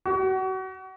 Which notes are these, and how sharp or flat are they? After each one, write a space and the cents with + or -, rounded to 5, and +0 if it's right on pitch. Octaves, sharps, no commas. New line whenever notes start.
F#4 +30